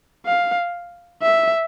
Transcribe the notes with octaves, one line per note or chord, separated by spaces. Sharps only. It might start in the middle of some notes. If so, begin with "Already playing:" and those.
F5
E5